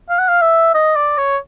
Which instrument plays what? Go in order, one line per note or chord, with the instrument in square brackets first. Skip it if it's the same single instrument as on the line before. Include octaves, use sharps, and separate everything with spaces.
[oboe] F5
F#5
F5
E5
D#5
D5
C#5